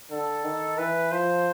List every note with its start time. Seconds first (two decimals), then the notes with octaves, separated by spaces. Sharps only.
0.10 D3 A4
0.44 D#3
0.78 E3 B4
1.11 F3 C5